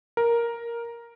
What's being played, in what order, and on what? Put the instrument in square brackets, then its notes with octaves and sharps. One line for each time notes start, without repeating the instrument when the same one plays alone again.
[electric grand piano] A#4